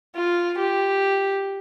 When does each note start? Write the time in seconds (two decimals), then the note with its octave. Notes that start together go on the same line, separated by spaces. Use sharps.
0.16 F4
0.58 G4